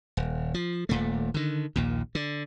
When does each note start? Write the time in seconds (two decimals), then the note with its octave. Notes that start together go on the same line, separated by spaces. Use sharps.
0.17 D#1
0.54 F3
0.89 D#1 A#2 A3
1.34 D3 D#3
1.76 A#1 D#2 A#2
2.15 D3